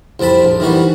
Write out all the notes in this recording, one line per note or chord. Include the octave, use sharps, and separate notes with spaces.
C2 F2 C4 A5 B5
A#1
D#3 E3 G3 F#4